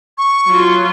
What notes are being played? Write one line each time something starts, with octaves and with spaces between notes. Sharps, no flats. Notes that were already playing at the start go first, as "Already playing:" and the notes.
C#6
F#3 F4